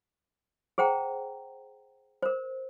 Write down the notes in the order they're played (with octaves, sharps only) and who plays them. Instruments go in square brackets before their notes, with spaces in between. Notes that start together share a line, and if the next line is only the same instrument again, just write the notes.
[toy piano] G#4 C5 F#5 G5 A#5
A#4 C5